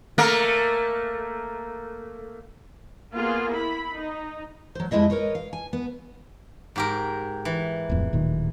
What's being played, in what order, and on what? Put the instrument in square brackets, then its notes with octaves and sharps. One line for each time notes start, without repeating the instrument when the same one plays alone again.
[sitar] A3 A#3 A#4
[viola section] A#3 B3 F4 G#4
E4 B5
D#4
[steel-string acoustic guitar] F#3 C5
F2 G3 G#3 E4 D#5 E5
A#4 B4 C#5 D#5
F5
G#5
B3
[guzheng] G#2 G4 A#4
E3
[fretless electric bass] D1 F2
D1 A#2 D#3